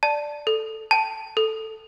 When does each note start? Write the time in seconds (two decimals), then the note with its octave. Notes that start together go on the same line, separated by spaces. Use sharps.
0.03 D5 A5
0.47 A4
0.91 G5 A5
1.37 A4